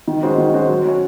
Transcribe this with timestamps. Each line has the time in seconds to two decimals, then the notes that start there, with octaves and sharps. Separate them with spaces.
0.08 D#3
0.23 G#3 C#4 F#4 C5
0.38 D#3
0.54 G#3 C#4 F#4 C5
0.69 F#3
0.85 C#4 F#4 C#5